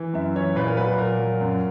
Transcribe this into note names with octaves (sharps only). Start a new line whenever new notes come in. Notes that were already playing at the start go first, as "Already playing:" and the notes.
Already playing: E3
F#2 E5
E3 C#5
A#2 B4
A#4
F#3 B4
B4
A#2 A#4
F#3
F#2